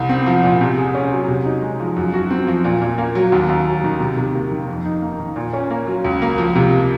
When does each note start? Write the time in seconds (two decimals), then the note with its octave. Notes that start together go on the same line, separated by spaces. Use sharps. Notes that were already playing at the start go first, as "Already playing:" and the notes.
Already playing: C2
0.09 C4
0.26 F3
0.43 A#2
0.61 C3
0.78 G#4
0.94 C#4
1.12 F#3
1.28 C3
1.45 D#4
1.62 G#3
1.80 F3
1.96 F#2
2.14 F#4
2.31 C4
2.47 F3
2.64 A#2
2.81 A#2
2.98 A#3
3.15 F#3
3.32 D#2
3.49 D#2
3.67 F#3
3.84 D#3
4.00 C3
4.17 C3
4.34 A#3
4.51 D#3
4.68 F2
4.86 D#4
5.02 A#3
5.20 D#3
5.36 A#2
5.53 C#4
5.70 A#3
5.87 F#3
6.05 C#2
6.22 A#3
6.38 F3
6.55 C3